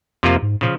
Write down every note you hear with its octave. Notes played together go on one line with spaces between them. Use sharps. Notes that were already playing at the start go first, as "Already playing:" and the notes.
F2 C3 F3 A#3 F4
G#2
A#2 C#3 F3